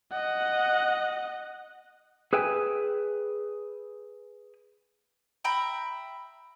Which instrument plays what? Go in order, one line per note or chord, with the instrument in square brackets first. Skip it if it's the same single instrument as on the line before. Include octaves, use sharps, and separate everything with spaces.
[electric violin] D#5 F#5
[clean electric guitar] G#4 B4 E5 G5 G#5
[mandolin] E5 G5 A#5 B5